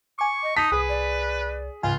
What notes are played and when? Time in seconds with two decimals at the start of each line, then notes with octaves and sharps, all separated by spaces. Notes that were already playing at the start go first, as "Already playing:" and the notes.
0.19 G#5 C#6 D6
0.43 D#5
0.57 D#4 A5 D#6 B6
0.72 C2 G#4 B4
0.89 D5
1.83 C#2 G#2 F4 F5 G#5